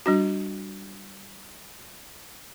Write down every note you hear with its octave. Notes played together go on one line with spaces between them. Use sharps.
G3 D4 F#4